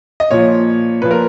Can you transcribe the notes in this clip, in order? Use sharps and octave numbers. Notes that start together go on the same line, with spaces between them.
D#5
A#2 F3 C#5
A#2 F3 B4
A#4